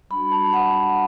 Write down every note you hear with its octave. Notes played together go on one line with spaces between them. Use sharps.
G3 D4 F#4 B5
A5
F#5